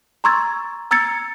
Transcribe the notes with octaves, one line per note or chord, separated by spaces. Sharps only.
A#5 C6 C#6 E6 G#6 A6
A#5 E6 G#6 A6 C#7